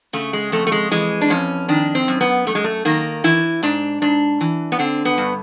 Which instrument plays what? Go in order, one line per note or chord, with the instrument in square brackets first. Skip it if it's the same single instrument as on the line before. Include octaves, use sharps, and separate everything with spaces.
[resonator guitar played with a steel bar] C#3 A3
G#3
F2 A3
A3
G#3
E3 G#3
D4
F2 C#4
D#3 D4
C4
F#2
B3
F#2 A3
G#3
A3
D#3 A#3
E3 E4
G#2 D4
G#2 D4
E3
B3
D3 C4
B3
G2